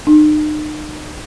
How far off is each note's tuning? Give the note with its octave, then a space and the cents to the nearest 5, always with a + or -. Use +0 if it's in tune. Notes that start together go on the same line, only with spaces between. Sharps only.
D#4 -40